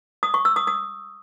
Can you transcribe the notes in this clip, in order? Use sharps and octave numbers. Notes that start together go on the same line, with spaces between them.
D#6
C#6
E6
D#6
D#6